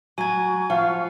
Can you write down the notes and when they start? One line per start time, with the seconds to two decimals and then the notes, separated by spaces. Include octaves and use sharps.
0.18 F#3 G#5 C#6 G#6
0.70 F3 F5 F#5